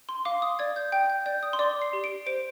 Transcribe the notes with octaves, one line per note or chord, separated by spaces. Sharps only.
C6
F5 D6
D#6
D5 G#6
G6
G5 G6
G6
D5 G6
D#6
C6
D5 D6
C7
G4
D7
C5 D7